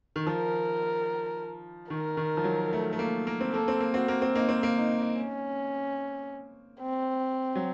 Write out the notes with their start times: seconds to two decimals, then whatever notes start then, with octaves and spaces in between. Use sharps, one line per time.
0.16 D#3
0.27 F3 A#4
1.90 D#3 A#4
2.17 D#3
2.37 F3
2.44 F#3
2.73 A3
2.93 A3
2.99 A#3
3.27 A#3
3.41 C4
3.54 A#3 A4
3.68 C4
3.80 A#3
3.94 C4 F#4
4.08 A#3
4.22 C4
4.35 A#3 D#4
4.49 C4
4.63 A#3
4.76 D#4
5.17 C#4
6.81 C4
7.56 F#3